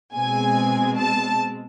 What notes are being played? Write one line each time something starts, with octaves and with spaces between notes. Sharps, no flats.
B2 G#3 C4 G#5
A5